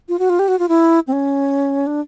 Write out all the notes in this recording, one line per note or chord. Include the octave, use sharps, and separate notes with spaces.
F4
F#4
F4
G4
F#4
F4
E4
C4
C#4
D4